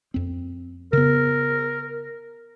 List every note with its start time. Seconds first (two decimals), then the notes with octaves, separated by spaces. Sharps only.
0.14 F2 C4
0.93 C#3 B3 A#4